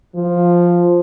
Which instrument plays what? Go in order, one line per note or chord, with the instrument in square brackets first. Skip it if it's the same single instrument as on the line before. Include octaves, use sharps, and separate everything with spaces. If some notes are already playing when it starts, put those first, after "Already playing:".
[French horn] F3